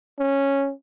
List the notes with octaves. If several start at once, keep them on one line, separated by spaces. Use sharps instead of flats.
C#4